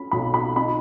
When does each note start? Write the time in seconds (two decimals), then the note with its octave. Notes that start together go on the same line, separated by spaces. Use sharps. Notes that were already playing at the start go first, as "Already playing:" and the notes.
Already playing: C#4 B5
0.11 B1 B5
0.34 B5
0.56 D#4 B5